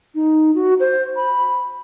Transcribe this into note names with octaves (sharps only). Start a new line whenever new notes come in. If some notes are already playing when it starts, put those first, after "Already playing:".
D#4
F#4
C5
B5